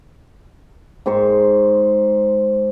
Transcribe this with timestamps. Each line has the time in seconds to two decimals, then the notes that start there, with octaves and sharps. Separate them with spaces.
1.06 G#2 C5 C#6